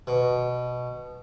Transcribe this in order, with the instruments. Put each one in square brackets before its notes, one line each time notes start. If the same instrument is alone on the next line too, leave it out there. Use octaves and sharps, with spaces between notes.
[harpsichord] B2